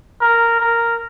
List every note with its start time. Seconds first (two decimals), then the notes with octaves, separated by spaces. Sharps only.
0.21 A#4
0.60 A#4